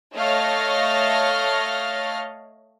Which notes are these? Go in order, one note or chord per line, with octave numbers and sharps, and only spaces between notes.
A3 C#5 D#5 F5 F6 A#6